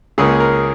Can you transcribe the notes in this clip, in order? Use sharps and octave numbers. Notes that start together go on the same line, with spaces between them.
C#2 C#3 A#3 C#4 G#4
A#4